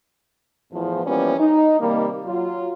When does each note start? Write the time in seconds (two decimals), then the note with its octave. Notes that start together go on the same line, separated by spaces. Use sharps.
0.72 E2 A2 F3
1.05 E3 F3 G3 A#3 B3 C#4
1.39 D#4
1.80 C3 D#3 G3 A#3
2.26 F#3 F4